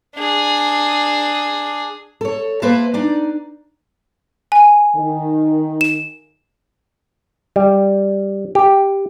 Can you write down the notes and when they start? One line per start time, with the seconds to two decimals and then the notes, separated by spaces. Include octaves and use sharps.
0.16 D4 G#4
2.21 A4 C#5
2.62 A#3 B4 C5 E5 A5
2.94 D4 D#4 D5
4.52 G#5
4.95 D#3
5.81 E7
7.56 G3
8.55 G4